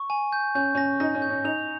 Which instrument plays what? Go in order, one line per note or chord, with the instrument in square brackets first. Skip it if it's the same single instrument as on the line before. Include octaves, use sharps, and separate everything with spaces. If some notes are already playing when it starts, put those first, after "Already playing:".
Already playing: [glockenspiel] C#6
G#5
G6
[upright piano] C#4 [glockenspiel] G6
[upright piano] C#4 [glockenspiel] A#6
[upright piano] D#4 [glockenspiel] A#6
[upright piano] C#4
[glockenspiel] G6
[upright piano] C#4
[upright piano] D#4 [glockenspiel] F7